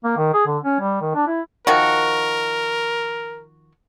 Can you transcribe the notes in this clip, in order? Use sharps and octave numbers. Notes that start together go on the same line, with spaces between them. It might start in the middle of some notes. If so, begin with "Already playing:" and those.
A#3
D#3
G#4
D3
C#4
G3
D#3
D4
E4
D#3 F3 F#4 A#4